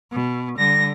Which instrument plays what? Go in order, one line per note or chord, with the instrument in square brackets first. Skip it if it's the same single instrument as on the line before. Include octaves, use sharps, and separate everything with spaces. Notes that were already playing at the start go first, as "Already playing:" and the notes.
[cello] B2
[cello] D3 G3 [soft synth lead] A#6